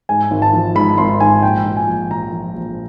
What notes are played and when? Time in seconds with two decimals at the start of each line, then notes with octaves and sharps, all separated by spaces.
0.09 G#2 G#5
0.31 G#1
0.42 A5
0.53 F3
0.75 G#2 B5
0.98 G#1 C6
1.20 G#2 G#5
1.42 A#1 G5
1.66 F3
1.77 G#5
1.88 A#1
2.10 F3 A#5
2.32 F3
2.55 A#1